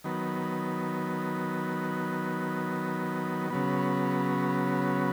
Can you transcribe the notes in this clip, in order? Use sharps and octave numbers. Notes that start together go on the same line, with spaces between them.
D#3 F#3 B3
C#3 F#3 B3